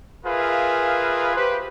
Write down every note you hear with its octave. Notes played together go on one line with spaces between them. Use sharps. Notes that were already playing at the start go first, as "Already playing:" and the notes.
F4 G#4 A#4 B4 E5 F5
G4 B4 C5